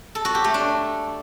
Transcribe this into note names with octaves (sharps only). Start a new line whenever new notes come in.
A4
F#4
G4
A3
D4